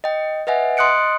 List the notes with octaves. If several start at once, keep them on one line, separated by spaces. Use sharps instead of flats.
D#5 G5
B4 D#5 E5 F#5 G#5
D#5 C6 D#6 F#6 C#7 D7